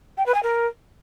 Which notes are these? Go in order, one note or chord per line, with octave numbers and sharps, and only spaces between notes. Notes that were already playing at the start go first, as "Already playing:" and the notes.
G5
B4
G#5
A#4